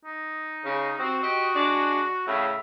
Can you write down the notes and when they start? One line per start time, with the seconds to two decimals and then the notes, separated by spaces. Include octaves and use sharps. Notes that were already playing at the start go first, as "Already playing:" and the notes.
0.05 D#4
0.64 C#3
0.99 C4 F#4
1.22 G4 D#5
1.56 G#3 D4
2.27 A2 C#3 E5